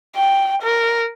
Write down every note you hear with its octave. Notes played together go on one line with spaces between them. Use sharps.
G5
A#4